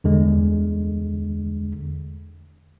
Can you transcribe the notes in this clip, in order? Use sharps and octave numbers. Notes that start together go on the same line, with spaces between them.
E2 D3 G#3